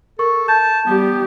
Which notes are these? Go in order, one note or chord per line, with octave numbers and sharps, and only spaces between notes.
A4 A#4 C#6
A5 G6
G3 B3 G4